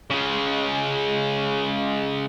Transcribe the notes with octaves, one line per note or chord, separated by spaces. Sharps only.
C#3 G#3